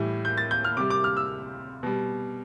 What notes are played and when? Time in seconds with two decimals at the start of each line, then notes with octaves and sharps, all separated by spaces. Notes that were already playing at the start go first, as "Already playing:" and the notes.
Already playing: A2 E3 G3
0.25 G6
0.38 A6
0.51 G6
0.65 F6
0.77 C3 G3 D6
0.90 D6
1.04 F6
1.17 E6
1.83 B2 G3